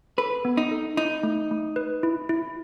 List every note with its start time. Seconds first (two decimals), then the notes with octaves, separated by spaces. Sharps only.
0.18 A4 B4
0.45 B3
0.57 D#4
0.71 A4
0.97 D#4 E4
1.23 A3
1.51 A3
1.76 B4
2.03 E4
2.29 E4